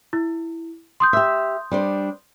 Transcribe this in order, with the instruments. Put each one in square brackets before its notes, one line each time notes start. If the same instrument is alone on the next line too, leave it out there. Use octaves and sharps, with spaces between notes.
[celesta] E4
C6 D#6 G6
[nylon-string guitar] G4 E5
G3 D4 C5